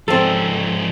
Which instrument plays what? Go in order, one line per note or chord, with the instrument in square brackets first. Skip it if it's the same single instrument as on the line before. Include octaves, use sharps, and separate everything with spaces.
[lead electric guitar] G#2 F3 [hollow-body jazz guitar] C4 A4